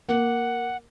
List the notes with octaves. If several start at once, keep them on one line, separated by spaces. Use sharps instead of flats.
A#3 F#5